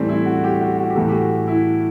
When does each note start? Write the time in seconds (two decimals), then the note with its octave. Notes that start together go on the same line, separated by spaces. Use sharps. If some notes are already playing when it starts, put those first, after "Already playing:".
Already playing: A2 E3 G3 A3 C4
0.09 E4
0.26 F#4
0.44 G4
0.61 F#4
0.78 F#4
0.90 G4
0.95 A2 E3 A4
1.09 G4
1.13 F#4
1.47 E4